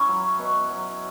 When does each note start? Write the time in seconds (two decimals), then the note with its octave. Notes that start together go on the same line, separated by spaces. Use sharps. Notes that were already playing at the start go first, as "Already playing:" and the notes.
Already playing: C#4 E4
0.08 F#3
0.39 B2
0.70 F#3